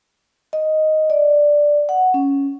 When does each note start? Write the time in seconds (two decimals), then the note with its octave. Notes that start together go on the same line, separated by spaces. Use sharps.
0.53 D#5
1.10 D5
1.89 F#5
2.14 C#4